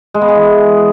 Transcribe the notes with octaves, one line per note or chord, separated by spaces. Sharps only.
G#3
B3
G#4
E3